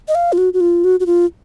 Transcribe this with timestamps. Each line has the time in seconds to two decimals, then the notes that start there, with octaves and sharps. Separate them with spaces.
0.08 D#5
0.15 F5
0.33 F4
0.38 F#4
0.53 F#4
0.60 F4
0.84 F#4
1.00 F#4
1.06 F4